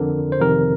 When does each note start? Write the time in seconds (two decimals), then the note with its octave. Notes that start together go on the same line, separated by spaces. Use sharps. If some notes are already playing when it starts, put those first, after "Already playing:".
Already playing: F2 D3 A#4
0.32 C5
0.41 F2 C3 D#3 A#4